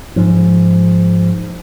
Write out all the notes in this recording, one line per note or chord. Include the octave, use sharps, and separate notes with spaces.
G#2 F3